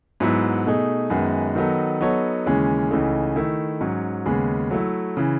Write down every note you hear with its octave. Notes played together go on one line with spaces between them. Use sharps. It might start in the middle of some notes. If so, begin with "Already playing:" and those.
G#2 F#3 B3 E4
B2 A3 D#4 G#4
F#2 D#3 G#3 B3
D#3 F#3 B3 D#4 A4
F#3 B3 D#4 A4 C#5
D#2 C#3 E3 G#3 C#4
C#2 C#3 E3 A3 D#4
D#3 A3 E4
G#2 F#3 C#4
D#2 C#3 G#3 B3
F#3 A3 E4
C#3 E3